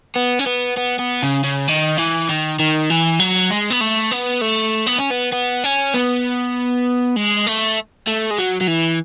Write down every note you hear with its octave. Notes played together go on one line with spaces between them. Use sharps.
B3
C#4
B3
B3
B3
C#3
C#3
D#3
E3
D#3
D#3
E3
F#3
G#3
B3
A3
B3
A3
B3
C#4
B3
B3
C#4
B3
G#3
A3
A3
G#3
F#3
F#3
E3